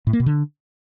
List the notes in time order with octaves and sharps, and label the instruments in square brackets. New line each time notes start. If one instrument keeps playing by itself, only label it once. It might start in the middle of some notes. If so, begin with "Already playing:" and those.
[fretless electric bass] A2
A#3
B2
D3